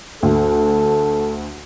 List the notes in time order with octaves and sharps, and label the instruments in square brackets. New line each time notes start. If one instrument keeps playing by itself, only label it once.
[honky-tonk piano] D2 [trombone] A4